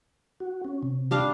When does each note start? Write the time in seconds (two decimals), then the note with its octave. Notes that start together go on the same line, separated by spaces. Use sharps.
0.40 F#4
0.65 C#4
0.83 C3
1.11 G3 D4 F5